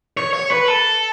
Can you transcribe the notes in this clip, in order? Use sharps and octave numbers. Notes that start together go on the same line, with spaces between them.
C#5
C#5
B4
A4